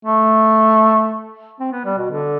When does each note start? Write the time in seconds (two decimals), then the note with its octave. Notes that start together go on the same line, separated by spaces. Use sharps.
0.05 A3
1.60 C4
1.72 B3
1.85 G3
1.98 B2
2.11 D3